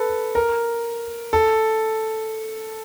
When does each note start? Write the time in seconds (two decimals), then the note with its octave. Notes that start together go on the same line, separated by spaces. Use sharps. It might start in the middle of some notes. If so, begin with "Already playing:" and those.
Already playing: A4 B4
0.35 A#4
1.33 A4